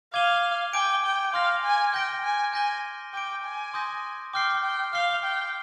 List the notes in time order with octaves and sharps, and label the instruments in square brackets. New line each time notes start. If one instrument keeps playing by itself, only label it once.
[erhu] F5 [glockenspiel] D6 G#6 D#7 G7
[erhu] G5 [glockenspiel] G#5 D6 G6 D7
[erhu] G5
[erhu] F5 [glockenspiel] C6 F6 A#6
[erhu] G#5
[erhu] G5 [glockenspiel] G6 A#6 D7
[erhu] G#5
[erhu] G#5 [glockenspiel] G6 A#6 D#7 G7
[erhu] G5 [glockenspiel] D6 G6 D7
[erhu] G#5
[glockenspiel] C6 D#6 G6 A#6
[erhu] G5 [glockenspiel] D6 F6 C7
[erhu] G5
[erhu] F5 [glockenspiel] F6 C7 G7
[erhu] G5